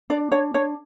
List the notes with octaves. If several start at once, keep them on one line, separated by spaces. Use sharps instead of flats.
D4 D5
D4 C#5
D4 C#5